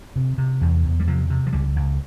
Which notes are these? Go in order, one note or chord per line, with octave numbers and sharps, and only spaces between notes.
C3
C3
E2
E2
G3
C3 F3
C3
F3
C#2 G3
C#2